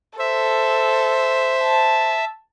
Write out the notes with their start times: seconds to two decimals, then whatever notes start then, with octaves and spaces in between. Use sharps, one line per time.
0.19 A4 C5 E5
1.63 A5